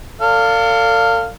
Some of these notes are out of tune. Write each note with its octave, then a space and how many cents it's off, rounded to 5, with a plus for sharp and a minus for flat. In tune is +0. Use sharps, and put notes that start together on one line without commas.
A4 +40 D5 -25 F5 +0